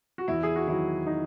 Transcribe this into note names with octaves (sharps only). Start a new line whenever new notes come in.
F#4
E2 E4
G#4
F#4
D#3 F#3 E4
D#4